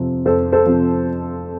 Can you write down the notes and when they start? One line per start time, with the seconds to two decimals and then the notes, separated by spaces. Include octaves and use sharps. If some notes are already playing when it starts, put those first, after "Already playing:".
Already playing: F2 C3 F3 C4
0.25 F2 A4 C5
0.52 A4 C5
0.66 C3 F3 C4